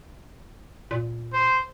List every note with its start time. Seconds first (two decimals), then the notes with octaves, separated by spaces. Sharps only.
0.91 A#2
1.33 C5